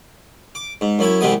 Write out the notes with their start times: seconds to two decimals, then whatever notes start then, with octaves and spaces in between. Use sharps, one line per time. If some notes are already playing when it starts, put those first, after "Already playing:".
0.55 D6
0.81 G#2
0.99 F#2 C#4 E4 C#5
1.21 C2 C3 E3 G#3 B3 D#6